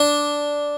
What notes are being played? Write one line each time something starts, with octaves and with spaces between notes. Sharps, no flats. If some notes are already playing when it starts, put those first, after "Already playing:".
Already playing: D4